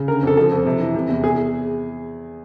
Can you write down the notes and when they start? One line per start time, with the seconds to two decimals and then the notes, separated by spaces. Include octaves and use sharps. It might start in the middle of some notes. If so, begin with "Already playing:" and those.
Already playing: C#3
0.08 D3 A#4
0.23 F2 A4
0.37 F3 A4
0.52 F2
0.66 C3
0.80 E3
0.95 C3
1.09 E2
1.24 G#4